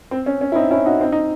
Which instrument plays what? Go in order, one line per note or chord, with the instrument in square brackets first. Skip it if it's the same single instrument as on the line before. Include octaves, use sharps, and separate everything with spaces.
[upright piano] C4
C#4
C#4
E4
C4 D#4
C#4 E4
D#4 F#4
C4 D#4
D#4